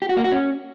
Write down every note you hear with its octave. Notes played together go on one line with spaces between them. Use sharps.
G4
F#4
A#3
F#4
C#4